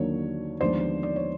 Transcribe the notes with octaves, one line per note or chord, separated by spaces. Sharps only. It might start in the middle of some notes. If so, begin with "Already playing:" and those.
Already playing: D#2 D3 F#3 A#3 C#5
D#2 D3 F3 G#3 B3 C5 D5
D5
C#5